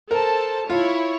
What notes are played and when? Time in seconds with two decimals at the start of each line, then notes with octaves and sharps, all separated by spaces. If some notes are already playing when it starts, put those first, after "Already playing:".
0.11 A4 A#4 C5 A5
0.70 E4 F4 C#5